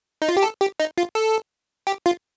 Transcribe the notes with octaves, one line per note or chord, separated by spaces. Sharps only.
D#4
F4
G4
A4
G4
D#4
F4
A4
G4
F4